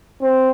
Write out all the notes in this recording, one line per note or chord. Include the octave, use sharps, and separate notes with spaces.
C4